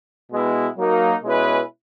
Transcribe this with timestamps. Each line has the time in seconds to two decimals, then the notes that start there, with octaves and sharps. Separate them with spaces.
0.32 B2 G#3 B3 E4
0.78 F#3 A#3 D#4
1.23 B2 G#3 C#4 E4 B4